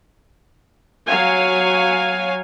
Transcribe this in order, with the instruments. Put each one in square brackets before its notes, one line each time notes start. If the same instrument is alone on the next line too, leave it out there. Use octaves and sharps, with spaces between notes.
[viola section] F#3 C#5 F5 G#5